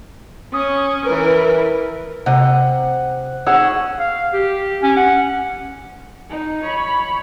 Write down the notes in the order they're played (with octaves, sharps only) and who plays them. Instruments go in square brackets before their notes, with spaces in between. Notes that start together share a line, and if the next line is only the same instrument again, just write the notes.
[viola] C#4 [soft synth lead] D#6
[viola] E3 A#4 [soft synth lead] B4
[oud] C3 D#5 [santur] F#5
[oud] C#4 D#4 [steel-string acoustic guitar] G#4 F#5 G#5 [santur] E6
[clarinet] F5
G4
C#4
F#5
[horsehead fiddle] D#4
C#5 B5